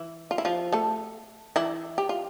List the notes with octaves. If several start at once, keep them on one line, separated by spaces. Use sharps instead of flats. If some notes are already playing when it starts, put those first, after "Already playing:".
Already playing: E3 E4
F4
E4
F3 F4
A3 A4
E3 E4
G4
F4